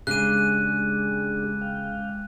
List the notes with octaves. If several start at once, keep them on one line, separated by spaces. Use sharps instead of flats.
C#3 G#3 D4 G4 G#4 D6 F#6 D#7
F5 G5